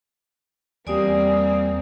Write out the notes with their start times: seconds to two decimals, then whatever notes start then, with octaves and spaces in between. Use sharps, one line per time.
0.87 E2 G3 A#3 C4 D5 G#5 D#6